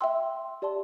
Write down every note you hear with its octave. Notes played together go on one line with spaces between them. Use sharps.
E5 G5 C6 E6
G4 D5 A5 C6